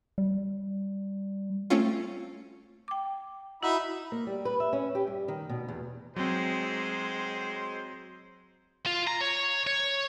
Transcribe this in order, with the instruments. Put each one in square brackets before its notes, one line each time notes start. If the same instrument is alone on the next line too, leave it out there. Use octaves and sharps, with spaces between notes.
[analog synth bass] G3
[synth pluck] A3 C4 C#4 F4
[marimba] G5 D6
[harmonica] D#4 E5 B5 [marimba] E4 F#4 F#5
[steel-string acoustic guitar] A#3
G3
B4
E5
C#4
G4
G2
D#3
B2
E2
[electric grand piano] F#3 C4 [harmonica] G#3 C5
[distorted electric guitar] F4
A#5
C#5
C#5